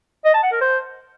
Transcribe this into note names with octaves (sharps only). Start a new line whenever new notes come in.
D#5
A5
F#5
A#4
C5